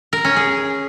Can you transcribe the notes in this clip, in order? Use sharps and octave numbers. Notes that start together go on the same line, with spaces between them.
A#4
C#4
G#4